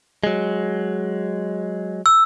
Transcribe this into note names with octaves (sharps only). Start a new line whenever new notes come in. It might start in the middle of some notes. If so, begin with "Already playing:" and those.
F#3 G#3
E6